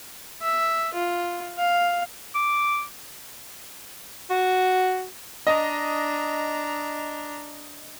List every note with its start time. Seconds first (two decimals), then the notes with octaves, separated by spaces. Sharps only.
0.41 E5
0.94 F4
1.58 F5
2.35 D6
4.30 F#4
5.47 D4 D#5 A#5